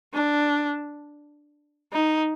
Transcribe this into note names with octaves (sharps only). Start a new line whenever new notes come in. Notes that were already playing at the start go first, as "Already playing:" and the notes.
D4
D#4